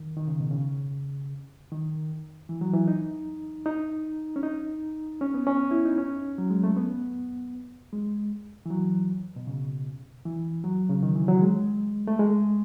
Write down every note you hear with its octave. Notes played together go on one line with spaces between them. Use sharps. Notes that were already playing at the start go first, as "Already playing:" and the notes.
Already playing: D#3
D#3
C#3
B2
C#3
D#3
E3
F#3
E3
D#4
D#4
C#4
D#4
C#4
B3
C#4
E4
D#4
C#4
F#3
G#3
A3
B3
G#3
E3
F#3
B2
C#3
E3
F#3
C#3
D#3
E3
F#3
G#3
A3
G#3